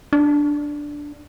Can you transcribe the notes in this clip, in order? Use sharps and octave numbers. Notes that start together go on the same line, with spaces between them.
D4